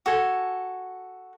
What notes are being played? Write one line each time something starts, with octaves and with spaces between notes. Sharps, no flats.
F#4 A4 G#5